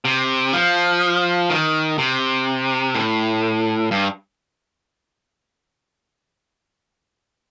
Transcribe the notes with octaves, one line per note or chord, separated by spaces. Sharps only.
C3
F3
D#3
C3
A2
G2